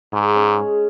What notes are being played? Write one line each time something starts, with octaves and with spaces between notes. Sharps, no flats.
G#2 G#4
C#4
G#3